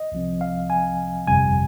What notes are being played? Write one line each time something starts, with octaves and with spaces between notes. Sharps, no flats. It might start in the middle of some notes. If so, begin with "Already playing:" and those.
Already playing: D#5
C2 C3 F3 C4
F5
G#5
G1 F2 C3 G3 G#5